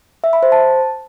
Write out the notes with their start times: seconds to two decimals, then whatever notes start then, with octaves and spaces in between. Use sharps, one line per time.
0.24 E5
0.33 B5
0.43 C5
0.52 A5